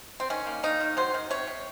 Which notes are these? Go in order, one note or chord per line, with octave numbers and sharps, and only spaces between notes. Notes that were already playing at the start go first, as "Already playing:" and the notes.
C4
D#3 C#4
A#3
A#3 D#4
D#3
F#3 C5
D#3
C3 C#5
C3